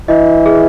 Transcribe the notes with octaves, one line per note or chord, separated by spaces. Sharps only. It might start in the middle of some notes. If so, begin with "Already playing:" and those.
E3 D#5
G#4